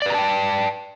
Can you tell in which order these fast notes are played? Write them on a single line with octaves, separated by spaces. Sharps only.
D5 B4 A#5 A5 G5